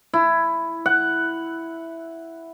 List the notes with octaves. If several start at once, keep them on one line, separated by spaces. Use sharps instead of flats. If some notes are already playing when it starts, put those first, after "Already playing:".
E4
F#5